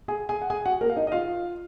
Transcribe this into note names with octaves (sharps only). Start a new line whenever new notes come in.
G#4 G#5
G#4 G#5
F#5
G#4 G#5
F#4 F#5
A#3 A#4
F5
D#4 D#5
D#5
F4 F5